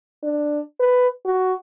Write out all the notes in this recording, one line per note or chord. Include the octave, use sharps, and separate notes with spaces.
D4
B4
F#4